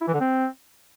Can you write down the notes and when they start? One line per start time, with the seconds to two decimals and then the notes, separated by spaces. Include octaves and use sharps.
0.01 E4
0.07 E3
0.14 D3
0.20 C4